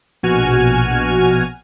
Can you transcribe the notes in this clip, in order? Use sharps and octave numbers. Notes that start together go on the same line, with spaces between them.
A#1 B2 F#4 G#5 F6 G#6